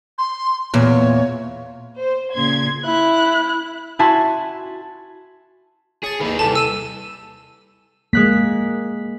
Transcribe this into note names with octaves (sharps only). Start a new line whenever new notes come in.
C6
E2 A#2 C#5
C5
A#2 C#3 C6 G#6
E4 F#6
E4 F#4 G#5 A5 B5 C6
G#4 C#5 A5
D#2 D#3 G#4 B4
C2 G4 A4 A5
E6 D#7 E7
G#3 A#3 F#6 B6